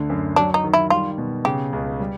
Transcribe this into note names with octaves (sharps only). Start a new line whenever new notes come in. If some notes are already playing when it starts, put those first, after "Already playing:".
Already playing: D2 D3
F#2
F#3 D4
D#4
D#3
E4
G3 F4
B2
C#3 G4
C#2
G3